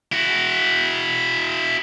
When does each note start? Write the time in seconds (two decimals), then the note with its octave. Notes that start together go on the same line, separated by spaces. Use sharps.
0.12 E4 F#4